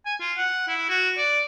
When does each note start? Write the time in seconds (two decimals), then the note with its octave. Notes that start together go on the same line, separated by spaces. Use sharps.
0.06 G#5
0.21 F4
0.37 F#5
0.68 E4
0.90 F#4
1.18 D5